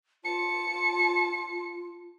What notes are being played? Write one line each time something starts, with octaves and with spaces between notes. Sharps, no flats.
F4 A5 C#7